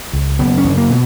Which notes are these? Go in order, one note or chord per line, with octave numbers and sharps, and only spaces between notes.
C#2
F#1 B3
C#4
F#1
A#3
B2